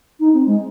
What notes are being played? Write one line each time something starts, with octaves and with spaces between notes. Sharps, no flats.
D#4
C4
G#3